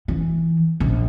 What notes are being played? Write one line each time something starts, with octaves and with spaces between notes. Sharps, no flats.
E3
A#1